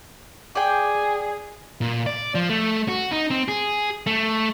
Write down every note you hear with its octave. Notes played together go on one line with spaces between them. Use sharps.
G#4 D5 G5
A#2
D5
F3
A3
F#4
D#4
C4
G#4
A3